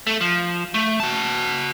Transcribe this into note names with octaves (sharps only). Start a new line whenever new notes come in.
A3
F3
A3
F#4 A5